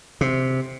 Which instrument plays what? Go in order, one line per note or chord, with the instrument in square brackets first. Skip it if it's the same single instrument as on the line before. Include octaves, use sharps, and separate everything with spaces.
[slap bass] C3